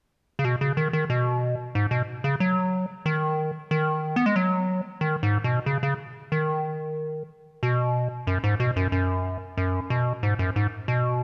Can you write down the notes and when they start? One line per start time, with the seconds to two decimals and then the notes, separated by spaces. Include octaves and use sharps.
0.39 C#3
0.44 B2
0.61 C#3
0.77 D#3
0.93 D#3
1.10 B2
1.75 G#2
1.91 B2
2.24 C#3
2.40 F#3
3.06 D#3
3.71 D#3
4.16 B3
4.26 G#3
4.36 F#3
5.01 D#3
5.23 G#2
5.44 B2
5.66 C#3
5.83 C#3
6.32 D#3
7.63 B2
8.27 F#2
8.44 G#2
8.60 B2
8.76 F#2
8.92 F#2
9.57 F#2
9.90 B2
10.23 G#2
10.39 F#2
10.56 G#2
10.88 B2